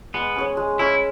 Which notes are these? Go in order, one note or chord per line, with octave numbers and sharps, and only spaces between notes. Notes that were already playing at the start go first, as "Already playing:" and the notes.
G#3 B3
C#4 G#4 C#5
G#3
C#4 E4 G#4 C#5